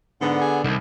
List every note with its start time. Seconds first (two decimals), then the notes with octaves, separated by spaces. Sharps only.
0.21 G#2 D3 B3
0.41 G#4
0.64 C2 D#3